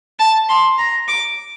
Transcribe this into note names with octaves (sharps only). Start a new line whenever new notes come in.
A5
C6
A#5
D6